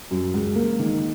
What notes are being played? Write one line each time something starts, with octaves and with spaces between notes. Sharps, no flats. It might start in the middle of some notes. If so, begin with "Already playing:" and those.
F#2
C#2
A#3
D#3